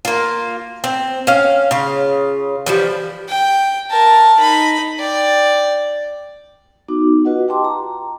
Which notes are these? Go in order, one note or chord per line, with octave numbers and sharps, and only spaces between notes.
A#3 F4
C4
C#4 F5
C#3 F4
E3 F3 G3
G5
A#4 A5
D#4 B5
D5 G5
B3 D#4 F#4 D6
F4 F#4 B4 D#5 F#5
G4 G5 A5 C6 D6
A#5